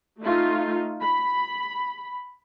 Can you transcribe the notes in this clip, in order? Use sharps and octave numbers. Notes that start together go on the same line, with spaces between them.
A3 D#4 F4
B5